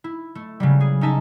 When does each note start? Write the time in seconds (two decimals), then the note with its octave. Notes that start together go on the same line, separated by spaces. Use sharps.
0.04 E4
0.35 A3
0.60 C#3 F#3 G3
0.80 G#4
1.01 C#4 D#4 E5 A5